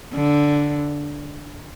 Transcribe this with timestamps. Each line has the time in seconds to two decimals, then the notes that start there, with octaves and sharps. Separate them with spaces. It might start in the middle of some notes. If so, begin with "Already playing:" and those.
0.13 D3